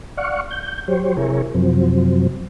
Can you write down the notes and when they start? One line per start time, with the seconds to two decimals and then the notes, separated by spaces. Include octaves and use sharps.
0.17 D5 F5 F#5 C#6
0.51 G6
0.88 F#3 G4 C5 C#5
1.17 C3 E4 G#4 A#4 C#5
1.54 F#2 C3 F3 F#3 C4